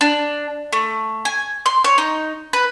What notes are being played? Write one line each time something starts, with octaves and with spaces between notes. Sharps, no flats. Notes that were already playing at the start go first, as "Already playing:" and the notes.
D4
A3
G#5
C6
C#5
D#4
B4